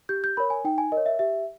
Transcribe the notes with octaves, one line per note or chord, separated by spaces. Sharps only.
G4 G6
G6
A#4 C#5 B5
G#5
D#4 G5
G#5
A#4 D#5
C#5
E5
G4 E5